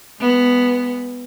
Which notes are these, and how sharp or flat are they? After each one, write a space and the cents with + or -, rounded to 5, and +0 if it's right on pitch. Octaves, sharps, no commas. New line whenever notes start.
G#3 -25 B3 +0